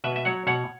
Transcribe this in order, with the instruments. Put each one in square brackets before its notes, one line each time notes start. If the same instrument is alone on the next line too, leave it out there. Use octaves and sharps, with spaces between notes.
[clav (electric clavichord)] B2 B4 E5
E5
F#3 C#5 F#5
B2 C#5 F#5